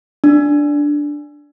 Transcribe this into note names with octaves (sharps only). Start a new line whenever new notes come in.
D4